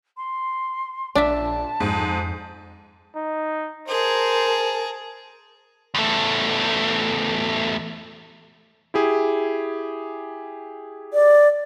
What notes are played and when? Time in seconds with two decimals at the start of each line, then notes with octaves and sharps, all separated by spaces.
0.17 C6
1.15 A#1 D4 E5 A5
1.80 F2 G#2
3.15 D#4
3.88 G#4 A#4 C5 A5
5.95 E2 A3
8.94 E4 G4 G#4
11.13 D5